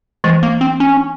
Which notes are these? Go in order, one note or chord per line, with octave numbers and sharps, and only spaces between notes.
E3 G#3
A#3
C4
C#4